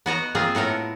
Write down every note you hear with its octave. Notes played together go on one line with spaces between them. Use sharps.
B3 F#4 D#5 A#5
A#3 C4 F4 G#4 C5
A2 B3 A4 A#4